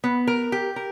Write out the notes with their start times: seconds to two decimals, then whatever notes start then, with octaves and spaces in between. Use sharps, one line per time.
0.04 B3
0.27 A#4
0.52 G4
0.76 A#4